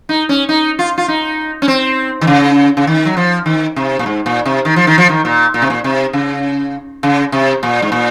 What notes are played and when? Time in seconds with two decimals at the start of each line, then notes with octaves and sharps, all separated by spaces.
0.09 D#4
0.29 C#4
0.49 D#4
0.79 F4
0.98 F4
1.08 D#4
1.62 C#4
1.68 C4
2.21 D#3
2.27 C#3
2.77 C#3
2.87 D#3
3.05 F#3
3.17 F3
3.46 D#3
3.76 C3
3.99 A#2
4.06 G#2
4.26 A#2
4.45 C3
4.65 D#3
4.76 F3
4.87 D#3
4.98 F3
5.09 D#3
5.25 A#2
5.54 A#2
5.62 C3
5.70 A#2
5.84 C3
6.13 C#3
7.03 C#3
7.32 C3
7.63 A#2
7.82 G#2
7.92 A#2